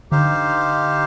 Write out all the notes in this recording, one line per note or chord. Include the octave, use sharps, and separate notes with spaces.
D3 D#4 G4 C5 F5